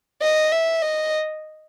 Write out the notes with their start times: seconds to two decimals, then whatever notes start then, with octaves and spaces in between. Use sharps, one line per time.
0.22 D#5
0.52 E5
0.83 D#5